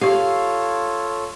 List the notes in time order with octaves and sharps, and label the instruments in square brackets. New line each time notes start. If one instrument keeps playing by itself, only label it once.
[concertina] F4 A4 C#5 [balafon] G4 C#6 [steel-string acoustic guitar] F5